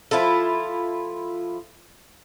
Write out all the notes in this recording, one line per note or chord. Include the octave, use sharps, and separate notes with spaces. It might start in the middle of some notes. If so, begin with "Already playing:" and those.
F3 E4 F4 A4